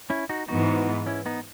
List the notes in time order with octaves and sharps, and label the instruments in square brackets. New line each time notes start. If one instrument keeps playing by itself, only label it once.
[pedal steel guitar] C#4 E4
D#4 F#4
[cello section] G#2 E3 B3 [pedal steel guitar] D#4 F#4
[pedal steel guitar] C#4 E4
B3 D#4